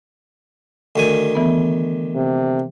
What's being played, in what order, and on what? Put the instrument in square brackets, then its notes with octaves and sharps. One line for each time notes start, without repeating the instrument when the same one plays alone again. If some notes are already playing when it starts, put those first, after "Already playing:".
[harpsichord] D2 D#3 G#5
[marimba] E3 B3
[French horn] C3